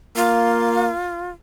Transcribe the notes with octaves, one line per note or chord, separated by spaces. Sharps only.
A#3 F4